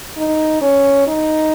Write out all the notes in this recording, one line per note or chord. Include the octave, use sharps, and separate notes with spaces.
D#4
C#4
D#4